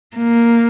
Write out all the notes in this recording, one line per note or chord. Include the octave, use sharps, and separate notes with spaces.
A#3